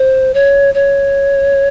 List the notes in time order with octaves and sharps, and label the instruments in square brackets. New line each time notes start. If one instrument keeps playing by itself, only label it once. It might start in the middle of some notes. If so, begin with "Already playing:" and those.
Already playing: [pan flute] C5
C#5
C#5